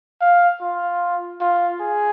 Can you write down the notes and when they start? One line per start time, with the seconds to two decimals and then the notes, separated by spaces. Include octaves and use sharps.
0.21 F5
0.61 F4
1.41 F4
1.81 G#4